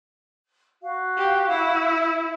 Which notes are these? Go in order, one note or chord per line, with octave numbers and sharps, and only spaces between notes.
F#4 F5
G4
E4